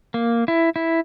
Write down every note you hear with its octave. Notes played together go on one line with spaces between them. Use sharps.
A#3
E4
E4